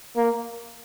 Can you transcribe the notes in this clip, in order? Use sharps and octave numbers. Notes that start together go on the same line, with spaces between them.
A#3